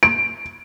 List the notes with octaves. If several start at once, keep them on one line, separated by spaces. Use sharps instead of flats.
D7